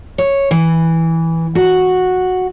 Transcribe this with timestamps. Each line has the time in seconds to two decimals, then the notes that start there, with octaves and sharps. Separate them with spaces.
0.18 C#5
0.51 E3
1.55 F#4